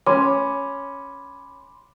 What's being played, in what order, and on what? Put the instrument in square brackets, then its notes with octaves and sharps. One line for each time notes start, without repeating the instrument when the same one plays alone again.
[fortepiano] C#4 [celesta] B5 C6 D6